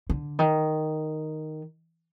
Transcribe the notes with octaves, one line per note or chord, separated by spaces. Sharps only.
D3
D#3